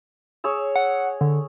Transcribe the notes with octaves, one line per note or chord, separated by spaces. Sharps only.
G#4 C#5 E6
F#5
D3